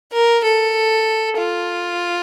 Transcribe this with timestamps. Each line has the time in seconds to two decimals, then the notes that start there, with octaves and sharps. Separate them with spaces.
0.13 A#4
0.44 A4
1.38 F4